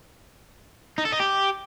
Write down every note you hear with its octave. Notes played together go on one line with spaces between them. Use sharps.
D#4
A4
D#4
G4